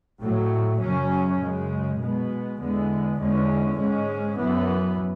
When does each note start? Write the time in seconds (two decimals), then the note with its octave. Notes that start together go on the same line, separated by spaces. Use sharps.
0.21 A2 F#3 A3
0.79 F#2 C#3 F#3 C#4
1.39 F#2 C#3 G#3
1.99 B2 G#3 B3
2.58 E2 D3 G#3 B3
3.18 E2 D3 G#3 C#4
3.77 G#2 G#3 C#4
4.37 F#2 E3 B3